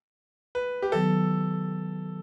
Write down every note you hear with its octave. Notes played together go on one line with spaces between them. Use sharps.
B4
G4
D#3 F#3 B3 A4